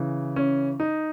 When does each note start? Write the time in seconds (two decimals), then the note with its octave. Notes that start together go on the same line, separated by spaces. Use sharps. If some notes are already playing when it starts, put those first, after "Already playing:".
Already playing: C#3 E3
0.36 C#4
0.80 D#4